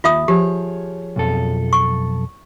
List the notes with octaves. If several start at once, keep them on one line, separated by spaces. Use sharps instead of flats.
D#2 F4 E5 D#6
F3 G4 G#4 C#5
B1 F2 A4
C#6